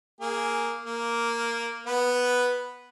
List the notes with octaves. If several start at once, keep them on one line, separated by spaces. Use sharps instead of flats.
A#3 G#4
A#3
B3 B4